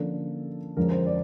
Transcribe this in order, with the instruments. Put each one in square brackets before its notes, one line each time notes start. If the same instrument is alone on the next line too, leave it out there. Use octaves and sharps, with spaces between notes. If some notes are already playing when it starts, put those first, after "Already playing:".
Already playing: [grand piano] D3 F3 A#3 C#4 A4
F2 D3 F3 G#3 C#4 A#4
C5
D5